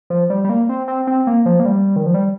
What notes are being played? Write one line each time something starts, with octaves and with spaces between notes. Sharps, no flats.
F3
G3
G3
A#3
C4
C4
C4
A#3
F3
A#3
G3
D#3
F3
G3